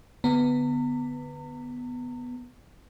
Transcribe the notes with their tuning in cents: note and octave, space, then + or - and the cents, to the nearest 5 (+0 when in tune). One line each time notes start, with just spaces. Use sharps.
D3 +0 B3 +0 A#5 -40